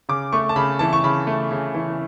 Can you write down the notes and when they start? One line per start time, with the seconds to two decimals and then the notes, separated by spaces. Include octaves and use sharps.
0.09 C#3 D6
0.33 A3 C#6
0.49 A5
0.56 C#3 B5
0.79 E3 A5
0.93 C#6
1.04 C#3 B5
1.27 A3
1.51 C#3
1.75 E3